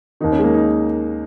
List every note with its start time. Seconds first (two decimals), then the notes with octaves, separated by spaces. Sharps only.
0.21 D#2 D#3 D#4
0.32 C#4
0.39 G#3
0.44 A#3
0.54 D#4